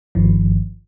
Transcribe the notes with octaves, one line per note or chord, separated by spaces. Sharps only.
G1 G2 D#3 F3